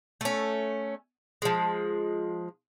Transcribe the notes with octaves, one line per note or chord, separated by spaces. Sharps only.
A3 C#4
F3 G#3